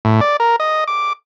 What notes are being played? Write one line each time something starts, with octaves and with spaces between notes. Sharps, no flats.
A2
D5
A#4
D#5
D6